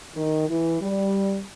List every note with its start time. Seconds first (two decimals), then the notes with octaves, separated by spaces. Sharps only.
0.15 D#3
0.49 E3
0.82 G3